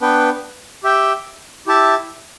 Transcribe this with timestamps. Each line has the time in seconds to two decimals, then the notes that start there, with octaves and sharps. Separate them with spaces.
0.01 B3 D4 B4 G5
0.83 G4 E5 G5
1.67 E4 G4 E5 A5